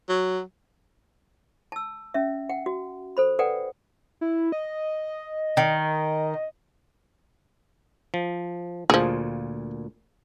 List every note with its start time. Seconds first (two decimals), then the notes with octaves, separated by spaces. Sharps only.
0.09 F#3
1.72 A5 E6
2.14 C#4 E5
2.50 F#5 G5
2.66 F#4
3.17 A4 C5 B5
3.39 A4 B4 D5 F#5 G5
4.21 E4
4.52 D#5
5.57 D#3
8.14 F3
8.90 D2 A#2 F3 G#4